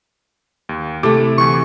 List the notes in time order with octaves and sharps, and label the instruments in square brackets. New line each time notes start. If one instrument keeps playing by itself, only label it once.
[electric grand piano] D#2
[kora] C3 A3 [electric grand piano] E4 A4 D6
[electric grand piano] D2 E3 [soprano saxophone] C#6